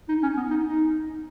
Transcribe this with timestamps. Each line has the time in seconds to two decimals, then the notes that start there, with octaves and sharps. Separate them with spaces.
0.09 D#4
0.23 C#4
0.37 B3
0.51 D#4
0.66 D#4